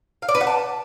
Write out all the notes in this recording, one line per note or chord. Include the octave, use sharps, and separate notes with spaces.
F5
D5
B4
F#5
A5